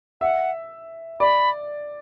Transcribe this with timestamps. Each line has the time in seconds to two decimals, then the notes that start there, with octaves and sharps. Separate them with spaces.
0.21 E5 F#5
1.20 D5 B5